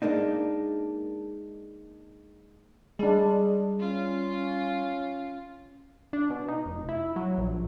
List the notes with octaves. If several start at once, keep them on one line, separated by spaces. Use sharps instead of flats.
G#3 A#3 D4 D#4
G3 G#3 D4 G#4
C#4 F4
D4
B2
D#4
F1
E4
F#3
A#1